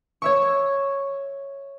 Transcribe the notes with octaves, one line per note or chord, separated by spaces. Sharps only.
C#5 E5 C#6